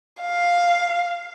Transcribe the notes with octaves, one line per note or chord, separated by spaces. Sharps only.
F5